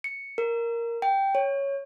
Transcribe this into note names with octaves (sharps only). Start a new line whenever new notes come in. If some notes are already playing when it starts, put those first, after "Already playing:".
C#7
A#4
G5
C#5